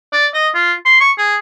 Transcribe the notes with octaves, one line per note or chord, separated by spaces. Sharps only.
D5
D#5
F4
C6
C#6
G#4